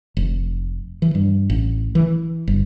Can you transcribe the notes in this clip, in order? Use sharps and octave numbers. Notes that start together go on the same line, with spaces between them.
F1
E3
G2
A1
E3
G1